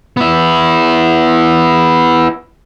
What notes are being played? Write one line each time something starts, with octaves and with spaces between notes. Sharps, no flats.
B3 E4